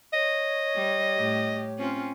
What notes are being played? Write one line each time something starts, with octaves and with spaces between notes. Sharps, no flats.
C#5 D#5
G3
A2 G4
C4 C#4 F4